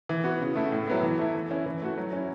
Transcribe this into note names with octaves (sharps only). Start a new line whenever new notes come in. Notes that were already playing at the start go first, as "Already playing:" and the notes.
E3
B3 F#4
C#3
A3 E4
A2
F#3 B3 E4
E3
A3 E4
E3
C#4 E4
E3
A3 F#4
F#3
C#4 E4